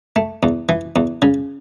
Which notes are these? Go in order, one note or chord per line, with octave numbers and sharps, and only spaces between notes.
A3
E2
E3
E2
C#3